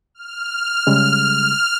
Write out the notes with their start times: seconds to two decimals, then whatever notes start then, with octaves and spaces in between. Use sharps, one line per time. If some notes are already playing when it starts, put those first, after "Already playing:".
0.15 F6
0.87 C#3 G3 G#3